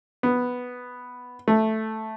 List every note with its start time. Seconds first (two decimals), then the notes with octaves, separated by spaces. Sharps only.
0.23 B3
1.48 A3